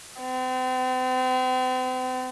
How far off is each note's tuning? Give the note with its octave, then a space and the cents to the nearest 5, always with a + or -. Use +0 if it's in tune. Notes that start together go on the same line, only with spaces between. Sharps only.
C4 -40